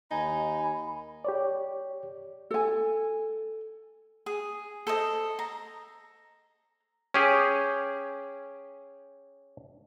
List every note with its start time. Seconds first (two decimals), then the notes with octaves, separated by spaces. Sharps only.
0.11 D#2 D#4 G#5 B5
1.25 G4 C#5 D5
2.51 A4 G#5
4.26 G#4
4.87 A4 C5 D#5
5.39 A#5
7.14 C#4 G4 G#4